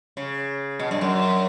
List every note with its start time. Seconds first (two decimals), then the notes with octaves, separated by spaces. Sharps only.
0.17 C#3
0.80 B2
0.91 G2
1.01 F#2